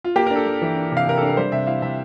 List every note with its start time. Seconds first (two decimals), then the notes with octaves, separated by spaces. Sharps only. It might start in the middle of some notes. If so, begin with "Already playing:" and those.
0.04 F4
0.16 A#3 G4
0.26 A#4
0.31 D4
0.36 A4
0.46 A#3
0.62 E3
0.77 D4
0.92 C3 F5
1.07 C3 A#4
1.17 D4 A4
1.29 A#4
1.37 G3 C5
1.52 C3 E5
1.67 E4 F5
1.82 C3 E5